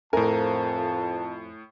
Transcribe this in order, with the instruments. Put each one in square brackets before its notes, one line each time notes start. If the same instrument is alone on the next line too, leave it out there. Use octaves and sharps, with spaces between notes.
[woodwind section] F2 [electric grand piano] A2 G#5 [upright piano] A#4 [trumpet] A5